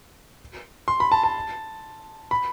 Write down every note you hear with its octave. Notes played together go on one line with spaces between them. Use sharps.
C6
B5
A5
A5
B5